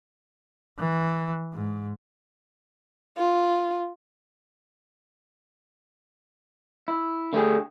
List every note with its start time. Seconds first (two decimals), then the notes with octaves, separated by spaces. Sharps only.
0.79 E3
1.54 G#2
3.18 F4
6.88 E4
7.33 D3 A3 E4 G4 G#4